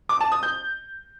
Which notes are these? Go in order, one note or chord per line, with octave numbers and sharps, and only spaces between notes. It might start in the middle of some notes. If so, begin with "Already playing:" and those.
D6
A5
D#6
G6